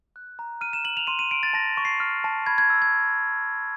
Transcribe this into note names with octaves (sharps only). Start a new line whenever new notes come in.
F#6
A#5
F6 D#7
E7
F6 F#7
F7
C6 D#7
D#7
C6 D7
A6
A5 A#6
C#6
C7
F6
A5
B5 G#6
G#6
E6
G#6